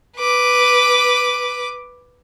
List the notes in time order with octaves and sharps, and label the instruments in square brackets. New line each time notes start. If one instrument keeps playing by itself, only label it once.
[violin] B4 D6